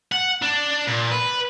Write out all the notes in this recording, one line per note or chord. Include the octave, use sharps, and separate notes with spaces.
F#5
D4
A#2
B4